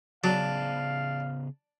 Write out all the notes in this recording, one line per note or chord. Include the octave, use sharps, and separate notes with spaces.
C#3 F#3 B3 D4 G#4 F5